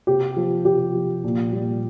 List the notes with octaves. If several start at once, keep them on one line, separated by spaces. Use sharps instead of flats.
C3 G4
F3
C3 G4
F3
A#2
G3